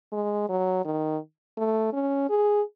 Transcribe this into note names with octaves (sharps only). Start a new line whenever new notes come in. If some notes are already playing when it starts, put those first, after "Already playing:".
G#3
F#3
D#3
A3
C#4
G#4